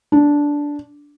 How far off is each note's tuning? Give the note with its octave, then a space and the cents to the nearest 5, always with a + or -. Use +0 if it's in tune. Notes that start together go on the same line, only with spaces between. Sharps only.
D4 -10